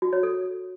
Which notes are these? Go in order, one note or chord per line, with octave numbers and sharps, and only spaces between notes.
F#4
C#5
A4